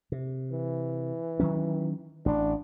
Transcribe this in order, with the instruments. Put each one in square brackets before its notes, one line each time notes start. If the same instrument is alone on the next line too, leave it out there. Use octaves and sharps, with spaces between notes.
[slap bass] C3
[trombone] E3
[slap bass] D#3 F#3 C#4
[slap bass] A1 [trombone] D4